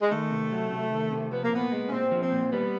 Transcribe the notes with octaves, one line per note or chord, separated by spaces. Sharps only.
G#3
D#3 A3
C3
F#3
C3
D#3
C3
F3 B3
A#3
A#2 B3
G#3
C#4
A#2 C4
F3
C4
A#2
G3 B3